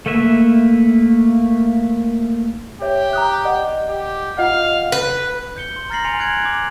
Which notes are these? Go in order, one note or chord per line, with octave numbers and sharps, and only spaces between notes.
A3 A#3 B4 E5
G4 C#5 E5
A#5 D#6 F#6
D5 D#5 F#5
G4
F4 D#5 F5 F#5
B4
G6 C#7 G7
C6
A#5 F6 A6 A#6 C7 F#7
G#5 C6 C#7 F7 F#7
F#6 G#6 D7 F#7
D6